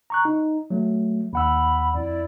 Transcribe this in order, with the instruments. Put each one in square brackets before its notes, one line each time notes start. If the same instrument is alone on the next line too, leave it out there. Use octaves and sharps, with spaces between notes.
[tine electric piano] A#5 C#6 F#6
D#4
F#3 A3
[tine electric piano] D#2 F#5 E6 [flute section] B5
[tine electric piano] F2 [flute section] E4 D5